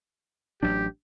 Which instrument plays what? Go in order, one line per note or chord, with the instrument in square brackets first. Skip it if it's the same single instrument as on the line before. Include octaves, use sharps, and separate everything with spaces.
[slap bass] A1 F#3 D4 [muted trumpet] G4